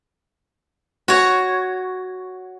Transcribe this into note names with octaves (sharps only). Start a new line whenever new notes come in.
F#4 C#5